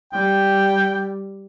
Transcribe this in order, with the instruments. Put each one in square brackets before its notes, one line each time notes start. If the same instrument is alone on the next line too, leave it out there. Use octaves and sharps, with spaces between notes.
[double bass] G3 [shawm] G5